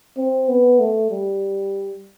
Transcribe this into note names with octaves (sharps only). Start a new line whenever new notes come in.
C4
B3
A3
G3